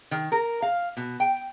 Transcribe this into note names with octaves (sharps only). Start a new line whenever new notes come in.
D#3
A#4
F5
B2
G5